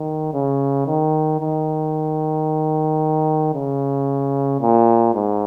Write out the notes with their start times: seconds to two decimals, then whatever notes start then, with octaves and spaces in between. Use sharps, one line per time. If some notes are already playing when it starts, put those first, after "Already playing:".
Already playing: D#3
0.33 C#3
0.87 D#3
1.40 D#3
3.54 C#3
4.61 A#2
5.14 G#2